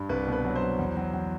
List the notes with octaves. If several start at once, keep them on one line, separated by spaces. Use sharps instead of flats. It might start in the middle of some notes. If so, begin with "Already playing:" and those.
Already playing: G2
C2 B4
B2
B4
F#3
C5
F#3
E2
F#3
F#3